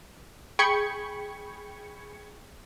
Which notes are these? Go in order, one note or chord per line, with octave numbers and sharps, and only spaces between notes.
G#4 G5 B5 C#6 G#6 C#7